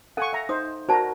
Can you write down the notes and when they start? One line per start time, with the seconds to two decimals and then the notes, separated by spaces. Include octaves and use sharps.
0.17 A4 F5 F#5 G#5 C#6
0.33 E5 A#5
0.49 D#4 C5 D#6
0.89 F#4 A#4 C5 D5 A5 A#5